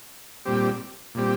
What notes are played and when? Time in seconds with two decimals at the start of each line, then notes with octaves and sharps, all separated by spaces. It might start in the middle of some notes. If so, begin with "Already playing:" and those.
0.45 A#2 G3 C4 G4
1.15 A#2 G3 C4 G4